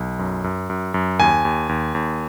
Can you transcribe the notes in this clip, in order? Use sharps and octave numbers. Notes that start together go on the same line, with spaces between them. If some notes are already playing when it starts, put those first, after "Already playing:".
Already playing: B1
F#2
F#2
F#2
F#2
D#2 G#5
D#2
D#2
D#2